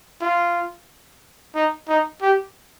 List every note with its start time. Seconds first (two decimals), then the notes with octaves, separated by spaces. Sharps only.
0.21 F4
1.55 D#4
1.88 D#4
2.22 G4